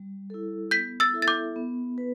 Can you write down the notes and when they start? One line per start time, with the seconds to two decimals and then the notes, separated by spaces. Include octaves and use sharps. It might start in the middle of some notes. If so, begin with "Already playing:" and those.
Already playing: G3
0.30 E4 A4
0.71 B3 G6 B6
1.00 E6 A6
1.14 E4 A4 E5
1.22 A6
1.28 D6 G6
1.56 B3
1.98 B4